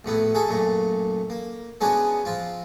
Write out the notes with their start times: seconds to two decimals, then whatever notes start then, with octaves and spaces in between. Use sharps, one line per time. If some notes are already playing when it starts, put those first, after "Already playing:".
0.04 A#1 A2 B3 E4
0.35 F#4 G#4 A4 E5
0.48 F#2 A#2 A3 A#5
1.30 A#3
1.81 G#3 B3 C#4 D4 F#4 G#4
2.25 F3 C4 F4